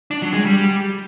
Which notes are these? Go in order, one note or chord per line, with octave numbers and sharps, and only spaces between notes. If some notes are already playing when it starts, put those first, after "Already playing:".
D4
F#3
G#3
G3